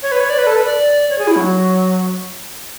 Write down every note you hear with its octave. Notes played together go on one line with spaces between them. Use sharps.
C#5
B4
C#5
D5
B4
A4
B4
D5
C#5
G#4
E4
F#3